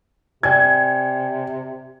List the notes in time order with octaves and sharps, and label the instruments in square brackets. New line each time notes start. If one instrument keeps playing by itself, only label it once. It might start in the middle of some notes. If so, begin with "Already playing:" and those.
[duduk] C3 [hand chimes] D5 G5 G#5 [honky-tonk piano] G#6